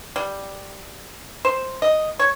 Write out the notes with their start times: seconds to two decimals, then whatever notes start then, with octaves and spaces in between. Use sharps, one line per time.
0.16 G3
1.45 C5
1.82 D#5
2.19 C#5